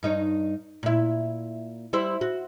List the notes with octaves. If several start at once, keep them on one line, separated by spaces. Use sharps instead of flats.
G2 D#4 C#5
A#2 E4
G3 E4 C5
F#4